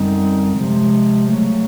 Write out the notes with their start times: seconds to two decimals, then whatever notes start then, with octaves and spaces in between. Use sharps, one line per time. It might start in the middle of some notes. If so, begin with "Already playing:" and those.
Already playing: F#2 D3 G3 C4 D#4
0.54 C3 F3 G#3
1.27 C#3 F#3 A3